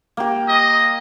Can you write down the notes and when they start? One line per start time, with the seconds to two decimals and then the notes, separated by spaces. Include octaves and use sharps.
0.17 A#3 G4
0.48 D#5